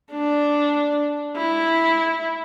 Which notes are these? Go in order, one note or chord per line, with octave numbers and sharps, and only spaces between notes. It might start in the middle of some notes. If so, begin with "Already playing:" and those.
D4
E4